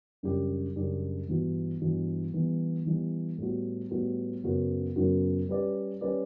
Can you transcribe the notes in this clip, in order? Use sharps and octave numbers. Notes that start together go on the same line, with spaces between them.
F#2 C#3 G3 D4 G4
F#2 C#3 G3 D4 G4
G2 E3 B3 D4 F#4
G2 E3 B3 D4 F#4
E3 G3 B3
E3 G3 B3
A2 G3 B3 F#4
A2 G3 B3 F#4
F#2 C#3 F#3 B3 F#4
F#2 C#3 F#3 B3 F#4
G3 C#4 G4 B4 D5
G3 C#4 G4 B4 D5